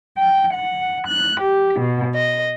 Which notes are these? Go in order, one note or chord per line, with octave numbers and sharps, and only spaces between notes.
G5
F#5
F#6
G4
B2
D#5